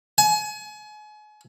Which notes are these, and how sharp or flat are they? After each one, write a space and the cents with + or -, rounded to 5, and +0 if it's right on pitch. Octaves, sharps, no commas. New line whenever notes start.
G#5 +35